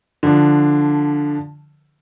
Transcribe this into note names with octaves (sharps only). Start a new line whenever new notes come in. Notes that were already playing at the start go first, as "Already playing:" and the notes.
D3 F3 D4